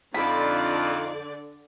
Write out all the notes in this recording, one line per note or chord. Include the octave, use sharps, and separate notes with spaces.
F2 D3 D#4 F4 D5 B5